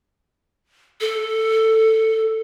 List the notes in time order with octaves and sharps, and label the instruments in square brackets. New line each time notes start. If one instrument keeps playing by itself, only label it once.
[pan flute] A4